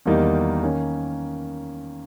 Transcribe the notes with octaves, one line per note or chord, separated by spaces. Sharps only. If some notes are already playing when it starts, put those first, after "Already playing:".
E2 D#3 G3 A#3 D#4
D#3 A#3 C#4